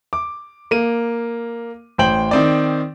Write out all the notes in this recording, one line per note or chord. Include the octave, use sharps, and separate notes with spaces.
D6
A#3 D#7
A1 C5 G5 F#7
D#3 C4 D5